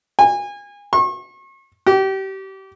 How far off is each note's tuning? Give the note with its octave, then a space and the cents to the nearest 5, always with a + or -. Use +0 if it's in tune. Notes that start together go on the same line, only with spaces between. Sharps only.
G#5 -30
C#6 -40
G4 -30